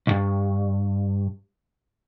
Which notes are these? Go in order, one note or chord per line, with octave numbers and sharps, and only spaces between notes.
B1 G2